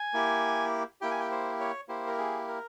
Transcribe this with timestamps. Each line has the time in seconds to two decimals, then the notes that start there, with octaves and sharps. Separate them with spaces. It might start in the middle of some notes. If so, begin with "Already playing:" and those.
Already playing: G#5
0.13 A#3 E4 G4
1.01 A#3 E4 G4 G5
1.11 G#5
1.20 G5
1.31 C5
1.60 C#5
1.89 A#3 E4 G4 C5
2.07 A#4
2.18 G#4
2.48 A#4